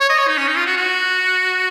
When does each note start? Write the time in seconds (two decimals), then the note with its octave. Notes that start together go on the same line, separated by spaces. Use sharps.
0.01 C#5
0.10 D#5
0.19 C#5
0.28 D#4
0.38 C#4
0.48 D#4
0.57 F4
0.66 F#4
0.77 F#4